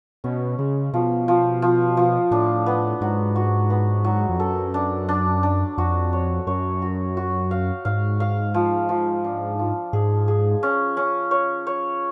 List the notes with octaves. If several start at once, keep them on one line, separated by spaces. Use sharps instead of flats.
B2 C#4
C#3 G#3
B2 F3
F3
F3
F3
A2 D4
B3
G#2 F#3
F#4
B3
F#3
F2
F#2 A4
D4
D4
D4
F2 F#4
C#5
F#2 C#5
F#4
F#4
F5
G#2 F5
F5
F3
F3
D4
F3
G#2 G#4
G#4
C#4
C#4
C#5
C#5